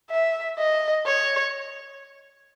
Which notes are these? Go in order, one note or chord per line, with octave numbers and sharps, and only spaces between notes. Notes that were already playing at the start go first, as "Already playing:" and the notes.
E5
D#5
C#5